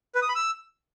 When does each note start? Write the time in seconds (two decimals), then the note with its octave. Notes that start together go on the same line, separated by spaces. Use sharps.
0.15 B4
0.22 D#6
0.29 B5
0.35 E6